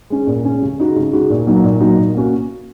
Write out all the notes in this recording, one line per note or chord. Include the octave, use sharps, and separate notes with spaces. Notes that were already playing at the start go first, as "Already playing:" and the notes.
G#3 C#4
A#2
G#3 C#4
C#3
G#3 D#4 F#4
C#3
G#3 D#4 F#4
A#2
F#3 A#3 D#4 F#4
A#2
F#3 A#3 D#4 F#4
A#2
A#3 C#4 F#4